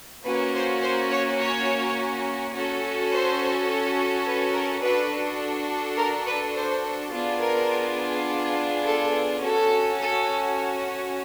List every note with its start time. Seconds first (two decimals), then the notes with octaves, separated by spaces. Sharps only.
0.24 A#3 C#4 F#4 B4
0.54 C5
0.82 C5
1.11 C#5
1.39 C#5
2.54 C#4 F#4 A4
3.12 C5
4.26 B4
4.54 A#4
4.82 D4 F#4 A4 B4
5.97 A#4
6.26 B4
6.54 C5
7.12 B3 D4 F4 G#4
7.40 A#4
8.83 A4
9.40 C#4 F#4 A4
9.99 A4